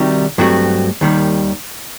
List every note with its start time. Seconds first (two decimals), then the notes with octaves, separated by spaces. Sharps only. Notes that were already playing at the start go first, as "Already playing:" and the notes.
Already playing: C3 D#3 G3 D#4 F#4
0.38 G2 F#3 A3 C4 F#4
1.01 D#2 D#3 G3